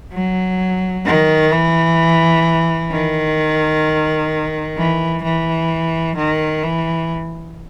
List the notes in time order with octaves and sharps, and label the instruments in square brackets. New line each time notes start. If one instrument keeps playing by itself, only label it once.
[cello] F#3
D#3
E3
D#3
E3
E3
D#3
E3